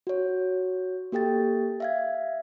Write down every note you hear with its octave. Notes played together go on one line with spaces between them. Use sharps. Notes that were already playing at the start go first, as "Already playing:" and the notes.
F#4 C#5
A#3 G4 A4 G5 A6
E5 F5 G#6